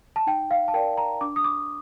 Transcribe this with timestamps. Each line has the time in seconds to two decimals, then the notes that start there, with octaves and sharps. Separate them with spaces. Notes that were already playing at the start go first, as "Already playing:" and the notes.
0.16 A5
0.27 D#4 G5
0.51 F5
0.68 A5
0.74 A#4 D5 G5
0.98 A#5
1.21 D4 D6
1.36 D#6
1.44 D6